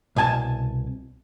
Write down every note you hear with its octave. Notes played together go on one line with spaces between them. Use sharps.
C2 B2 G#5 A5